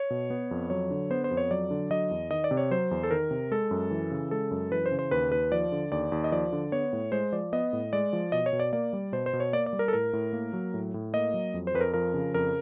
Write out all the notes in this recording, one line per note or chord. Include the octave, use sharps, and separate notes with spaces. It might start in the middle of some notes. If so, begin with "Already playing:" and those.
Already playing: C#5
B2
B3
F2
F#3 C#5
D3
B3 C5
C5
F2
C#5
F#3 D5
D3
F#3 D#5
E2
D#3 D#5
D5
C3
C#5
F#3 C5
E2
A4
D#3 A#4
C3
G#3 A4
F#2
E3
C#3
G#3 A4
F#2
E3 B4
C5
C#3
C5
D#2 B4
D#2 B4
F3 D5
D3
D#2 D5
D#2
D#5
F3 D5
D3
B3 C#5
A2
G#3 C5
F3 D5
B3 D#5
A2
G#3 D5
F3
B2 D#5
C#5
B2
D5
A#3 D5
G3
B2 C5
C5
B2
C#5
A#3 D5
D5
G3
A#4
A4
A2 A#4
A2
A#3
F#3
A2
A2
A#3 D#5
F#3
F2
C5
F2 B4
A#4
F3 A#4
C#3
F2 A#4